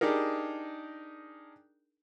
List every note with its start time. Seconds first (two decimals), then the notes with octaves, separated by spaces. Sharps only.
0.01 D4 D#4 G4 G#4 A#4